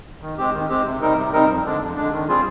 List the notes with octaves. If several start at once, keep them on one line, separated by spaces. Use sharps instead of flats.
D#3
G#3 C4 G4
D#3
G#3 C4 G4
C3
G3 C4 D#4 A#4
C3
G3 C4 D#4 A#4
F2
D3 G#3 D4
F2
D3 G#3 D4
D#3
G3 C4 F4 G#4